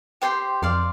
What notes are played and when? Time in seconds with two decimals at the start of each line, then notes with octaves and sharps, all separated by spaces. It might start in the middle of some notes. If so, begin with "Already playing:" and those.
0.22 G4 C5 G5 C6
0.62 F2 D5 F5 C6